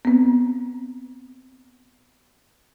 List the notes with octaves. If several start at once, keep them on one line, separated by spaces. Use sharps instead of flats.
B3 C4